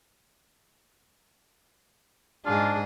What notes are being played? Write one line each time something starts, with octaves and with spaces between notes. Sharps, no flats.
G#2 D4 F4 G#4